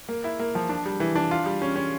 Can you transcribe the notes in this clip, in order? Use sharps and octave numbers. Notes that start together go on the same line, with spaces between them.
A#3
E4
A#3
F3
D4
G3
E3
D4
F4
G3
C#4
C#4